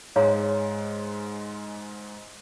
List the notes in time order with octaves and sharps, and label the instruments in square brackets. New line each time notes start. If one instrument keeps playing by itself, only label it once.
[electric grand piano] G#2 G#3 [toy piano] C#5 F5 A#5